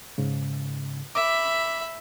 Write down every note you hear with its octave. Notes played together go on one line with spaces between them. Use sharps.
G#2 C#3
E5 B5 D6